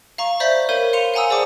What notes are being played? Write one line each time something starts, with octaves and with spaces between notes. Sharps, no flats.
F5 A#5 C#6
C5 D5 E5 B5 G6 B6
A#4 C#5 F5 B5 G6 D#7
F5 C6 C#7 D#7 F7
F5 F#5 G#5 A#5 D#6 E6
G#4 C5 D5 F#5 A5 D6